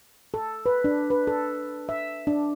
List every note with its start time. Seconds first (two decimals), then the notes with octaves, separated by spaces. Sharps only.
0.34 A4
0.66 B4
0.84 D4
1.10 B4
1.27 A4
1.89 E5
2.27 D4